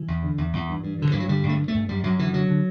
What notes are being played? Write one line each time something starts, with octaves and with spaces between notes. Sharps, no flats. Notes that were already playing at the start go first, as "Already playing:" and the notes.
Already playing: E3
E2
D3
E2
E2
G2
G2
G2 D3
G2 E3
F#3
D3 G3
G2
A3
G2
A3
G2
F#2 G3
F#2 F#3
D3 E3
D3 F#3
D3